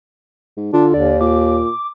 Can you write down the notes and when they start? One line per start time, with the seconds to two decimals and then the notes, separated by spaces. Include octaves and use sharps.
0.57 G#2
0.73 D3 D4 F4
0.94 D#2 D5
1.21 A#2 D6